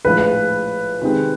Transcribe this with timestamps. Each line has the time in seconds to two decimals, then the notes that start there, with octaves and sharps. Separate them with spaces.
0.05 A#1 A2 F3 G#3 B4
1.02 C3 D#3 G#3 C4